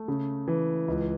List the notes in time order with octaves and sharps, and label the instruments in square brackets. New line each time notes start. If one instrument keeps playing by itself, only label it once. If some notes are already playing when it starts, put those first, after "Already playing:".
Already playing: [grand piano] A3
C#3
E3
C#2